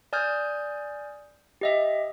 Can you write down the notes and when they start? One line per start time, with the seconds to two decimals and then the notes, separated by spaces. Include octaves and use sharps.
0.13 D5 G#5 D#6 F6 G6 G#6
1.61 G4 D#5 E5